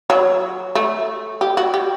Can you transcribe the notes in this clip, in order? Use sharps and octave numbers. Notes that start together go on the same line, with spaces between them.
F#3
A3
G4
F#4
G4